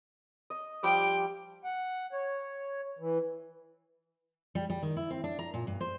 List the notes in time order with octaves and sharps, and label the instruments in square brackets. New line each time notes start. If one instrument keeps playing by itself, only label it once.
[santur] D#5
[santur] F3 G3 D6 [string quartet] G5
[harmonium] F#5
C#5
E3
[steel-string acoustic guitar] G3
G3
D#3
E4
C4
D4
A#5
A#2
G2
C5